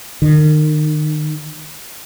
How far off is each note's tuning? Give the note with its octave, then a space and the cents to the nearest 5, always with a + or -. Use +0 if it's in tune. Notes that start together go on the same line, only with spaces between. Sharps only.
D#3 -30